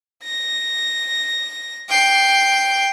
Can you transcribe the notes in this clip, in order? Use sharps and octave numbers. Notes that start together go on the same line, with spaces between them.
A#6
G5 C7